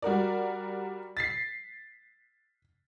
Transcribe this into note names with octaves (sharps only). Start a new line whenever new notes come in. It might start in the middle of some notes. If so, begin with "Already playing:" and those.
G3 F#4 A#4 D5
A6 B6 C7